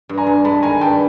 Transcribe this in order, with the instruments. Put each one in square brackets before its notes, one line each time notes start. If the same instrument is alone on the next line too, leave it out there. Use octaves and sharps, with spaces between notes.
[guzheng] G2
[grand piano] G#5 A#5
[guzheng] G2
[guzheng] G#3 [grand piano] A5 B5
[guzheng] D#3 [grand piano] G#5 A#5
[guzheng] G2 [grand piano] G5 A5
[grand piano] B5